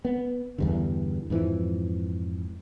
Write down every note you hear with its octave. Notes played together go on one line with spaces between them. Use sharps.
B3
E2 G2 D3
F2 G#2 E3 F3